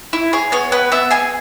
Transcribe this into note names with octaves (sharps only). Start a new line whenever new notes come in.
E4
G#4 C#5
B3 C#5
B3 B4
B3 E5
G#4 G#5